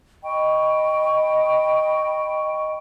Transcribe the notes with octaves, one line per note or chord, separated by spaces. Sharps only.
D#5 G5 B5 C#6